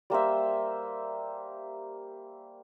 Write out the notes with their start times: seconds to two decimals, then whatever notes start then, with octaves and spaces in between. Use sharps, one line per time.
0.10 G3 A#3 C5 E5